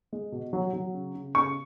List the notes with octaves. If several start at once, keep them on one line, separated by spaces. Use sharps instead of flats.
G#3
B2
F#3
F#3
C#3
C#3
C#3 C#6